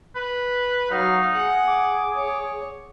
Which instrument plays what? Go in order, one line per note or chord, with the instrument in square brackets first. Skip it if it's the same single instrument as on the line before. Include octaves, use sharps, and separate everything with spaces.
[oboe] B4
[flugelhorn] F#3 [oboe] D#4 [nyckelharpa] F5
[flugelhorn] G#4 [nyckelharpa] F#5
[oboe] D6
[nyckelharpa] C#5